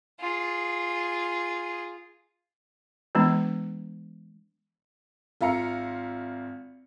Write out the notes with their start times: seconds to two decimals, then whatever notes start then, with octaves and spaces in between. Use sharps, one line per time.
0.20 F4 G#4
3.15 E3 G#3 B3 D4
5.41 G#1 F4 E5 F5 A#5 C#7